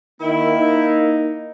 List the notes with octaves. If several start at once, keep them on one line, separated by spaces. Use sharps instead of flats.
D#3 A#3 E4
D#4